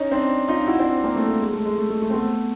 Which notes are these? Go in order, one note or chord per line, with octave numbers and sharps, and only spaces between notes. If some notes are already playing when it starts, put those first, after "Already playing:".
Already playing: C#4 D#4
C4 D4
D#4 F4
E4 F#4
C4 D4
A#3 C4
A3
A3
G#3
A3
G#3
A3
A3
A3
C4
A3 B3